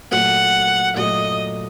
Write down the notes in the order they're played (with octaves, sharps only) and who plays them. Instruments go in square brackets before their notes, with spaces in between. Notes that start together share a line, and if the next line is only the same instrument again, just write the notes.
[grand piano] A#2 F#3 A3 [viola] F#5
[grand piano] A#2 F#3 A3 [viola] D#5